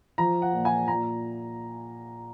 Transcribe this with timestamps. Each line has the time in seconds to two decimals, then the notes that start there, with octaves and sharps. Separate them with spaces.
0.18 F3 A#5
0.42 F#5
0.53 A#2
0.65 G#5
0.88 A#2 A#5